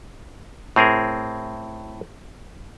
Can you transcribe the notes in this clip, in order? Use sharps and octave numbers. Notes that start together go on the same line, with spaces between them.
A2 C4 G#4 A#4